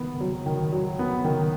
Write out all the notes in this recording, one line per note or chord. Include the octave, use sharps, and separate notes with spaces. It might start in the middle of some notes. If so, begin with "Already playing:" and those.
Already playing: D#3 B3
F#3
D#3
F#3
B3
D#3